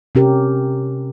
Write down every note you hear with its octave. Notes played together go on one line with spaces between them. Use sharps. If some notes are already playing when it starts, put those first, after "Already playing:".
C3 C#4 G4 A#4